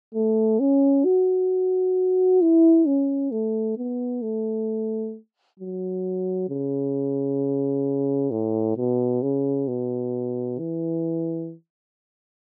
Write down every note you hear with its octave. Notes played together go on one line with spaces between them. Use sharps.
A3
C#4
F#4
E4
C#4
A3
B3
A3
F#3
C#3
A2
B2
C#3
B2
E3